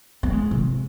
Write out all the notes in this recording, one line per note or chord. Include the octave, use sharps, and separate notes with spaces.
B3
G#3
C3